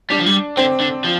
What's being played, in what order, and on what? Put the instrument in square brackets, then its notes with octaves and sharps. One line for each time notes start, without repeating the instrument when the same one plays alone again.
[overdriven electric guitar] G3 [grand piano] D4
[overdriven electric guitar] F3
G3
[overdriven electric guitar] D3 [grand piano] C4
[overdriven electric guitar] D3
F3